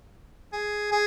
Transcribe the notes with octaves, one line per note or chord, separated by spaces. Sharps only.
G#4
G#4